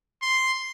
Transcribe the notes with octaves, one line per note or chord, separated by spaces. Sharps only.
C6